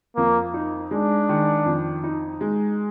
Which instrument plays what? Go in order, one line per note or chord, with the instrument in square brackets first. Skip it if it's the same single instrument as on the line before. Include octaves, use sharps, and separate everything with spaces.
[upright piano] F2 [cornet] A#3
[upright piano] D#4
[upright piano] G#3 [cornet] D4
[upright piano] D#3
F2
D#4
G#3